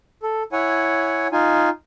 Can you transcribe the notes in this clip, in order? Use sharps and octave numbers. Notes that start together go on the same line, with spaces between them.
A4
E4 C#5 F#5 G#5
D#4 F4 G#5